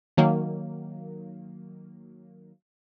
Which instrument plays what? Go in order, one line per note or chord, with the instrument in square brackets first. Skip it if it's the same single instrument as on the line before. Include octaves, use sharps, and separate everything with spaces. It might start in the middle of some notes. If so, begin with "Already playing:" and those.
[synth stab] D#3 F#3 A#3